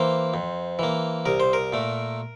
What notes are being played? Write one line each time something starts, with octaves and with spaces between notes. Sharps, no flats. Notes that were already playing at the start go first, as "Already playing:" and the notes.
Already playing: E3 A#3 C5
F2
E3 A#3
C2 A#4
C5
A#4
A#2 A3